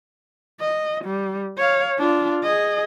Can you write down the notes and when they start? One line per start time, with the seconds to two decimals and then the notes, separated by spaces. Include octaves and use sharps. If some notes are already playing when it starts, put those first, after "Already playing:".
0.61 D#5
1.04 G3
1.57 C#5 F5
1.98 D4 F4
2.43 G#4 D#5